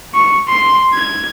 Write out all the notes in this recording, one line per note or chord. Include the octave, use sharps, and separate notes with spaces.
C#6
C6
G#6